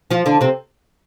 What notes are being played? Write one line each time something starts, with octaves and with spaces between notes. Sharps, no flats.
F3 F4
D3 D4
C3 C4